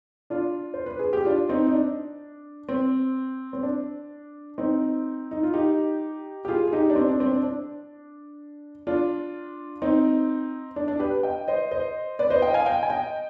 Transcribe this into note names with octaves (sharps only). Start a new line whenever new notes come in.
D4 F4
C5
B4
G#4
G4
D4 F4
C4 D#4
D#4
D4
C4
C4
D4
C4 D#4
D#4
F4
D#4 G4
G4
F4 G#4
G#4
D#4 G4
D4
C4
D4
C4
D4
D4
D4 F4
C4 D#4
D4
D4
G4 B4
D#5 G5
C5 D#5
C5 D#5
B4 D5
C5 D#5
D#5 G5
F5 G#5
D#5 G5
G#5
D#5 G5